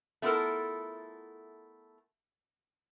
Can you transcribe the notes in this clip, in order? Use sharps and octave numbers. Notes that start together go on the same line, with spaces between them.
A3 B3 E4 F4 A4 A#4